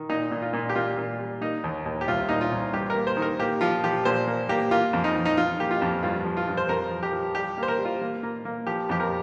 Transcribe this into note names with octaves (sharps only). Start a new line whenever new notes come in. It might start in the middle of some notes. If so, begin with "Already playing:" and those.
Already playing: D#3
A#2 D#4
A#2
F4
A#2
G4
A#2 F4
A#2
G3
A#3 D#4
D#2
D#2
G4
C2 F4
A#2 D#4
F4
C2
G2 G4
A#3 A#4
C5
D#3
A#4
A#3 G4
F3 F4
F3 G4
A#2 C5
A#3
A#3 G4
A#3 F4
F2
D#4
F2
D#4
F2 F4
A#3 G4
F4
F2
G2 F4
F3
F4
G2
C5
F2 A#4
F3
G4
F3
G3 G4
A#3 C5
A#4
G3
F4
A#3
A#3
A#3
F3 G4
F2 G4
A#4